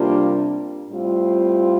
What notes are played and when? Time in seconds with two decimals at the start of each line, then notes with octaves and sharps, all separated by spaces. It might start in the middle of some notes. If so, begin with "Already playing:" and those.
Already playing: C3 G3 A#3 D4 F4
0.90 A2 G3 C4 F4